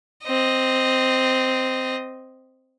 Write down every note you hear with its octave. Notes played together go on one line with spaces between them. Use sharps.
C4 D#5